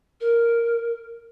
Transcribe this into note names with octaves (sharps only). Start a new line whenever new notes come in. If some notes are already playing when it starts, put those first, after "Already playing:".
A#4